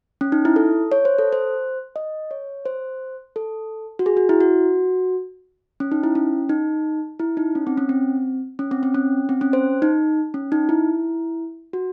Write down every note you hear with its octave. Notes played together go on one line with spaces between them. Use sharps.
C#4
D#4
E4
A4
C#5
C5
A4
C5
D#5
C#5
C5
A4
F#4
G#4
F#4
E4
F#4
C#4
D#4
E4
C#4
D#4
E4
D#4
C#4
C4
C#4
C4
C#4
C4
C4
C#4
C4
C#4
C5
D#4
C#4
D#4
E4
F#4